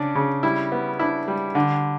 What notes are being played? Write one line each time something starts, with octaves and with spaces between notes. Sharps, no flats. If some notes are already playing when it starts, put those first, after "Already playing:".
Already playing: C#3 D4
C#3
G3 E4
B3
D4 E4
G3
D3